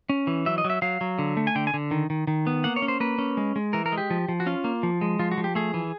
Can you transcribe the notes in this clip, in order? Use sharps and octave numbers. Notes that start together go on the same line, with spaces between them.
C#4
E3
F#3 E5
D#5
F#3
E5
F#3 F5
F#3
D3
A3
G#5
D3 G5
G#5
D3
D#3
D#3
D#3
B3
A#3 F#5
C#5
C#4
C5
A#3 B4
C#4
G#3
G#3
E3 A#4
A#4
G#3
G4
F3
F3
F#4
C#4 F4
A#3
F3
G#3
F3 F4
F#4
F3
G4
A3 G#4
E3